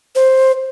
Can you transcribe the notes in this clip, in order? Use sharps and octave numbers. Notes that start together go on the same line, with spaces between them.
C5